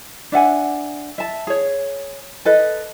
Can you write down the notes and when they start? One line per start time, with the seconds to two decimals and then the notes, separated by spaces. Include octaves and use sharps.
0.32 D4 E5 F#5 G#5
1.18 E5 A5
1.47 G#4 C#5
2.45 A4 B4 D#5